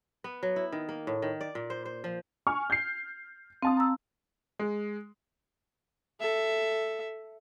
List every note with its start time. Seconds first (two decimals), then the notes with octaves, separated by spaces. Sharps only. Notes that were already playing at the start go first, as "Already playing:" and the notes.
0.24 B3
0.43 F#3
0.56 E4
0.72 D#3
0.89 A#3
1.07 A2
1.22 D#3
1.41 D5
1.55 A#2
1.70 C5
1.85 C5
2.04 F3
2.47 G#5 C#6 F6
2.70 G6 C7
3.63 C4 F5 A5 D#6
3.77 A#5 E6
4.59 G#3
6.20 A4 E5